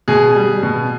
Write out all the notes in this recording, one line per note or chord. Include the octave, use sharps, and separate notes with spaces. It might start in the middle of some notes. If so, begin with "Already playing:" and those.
B2 G#4
G3
B2